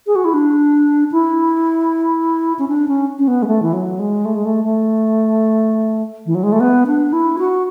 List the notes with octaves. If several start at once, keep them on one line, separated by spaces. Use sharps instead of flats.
G#4
F#4
E4
D4
E4
C#4
D4
C#4
C#4
B3
G#3
A3
E3
F#3
G#3
A3
G#3
A3
A3
E3
F#3
G#3
A3
B3
D4
E4
F#4